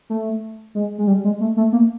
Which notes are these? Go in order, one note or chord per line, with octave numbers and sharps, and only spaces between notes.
A3
G#3
G#3
G3
G#3
A3
A3
A#3